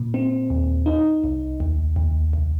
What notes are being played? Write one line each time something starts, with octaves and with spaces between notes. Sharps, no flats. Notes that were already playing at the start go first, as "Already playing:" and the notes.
Already playing: A#2
C4
D#2
D#4
C2
D#2
D#2
C2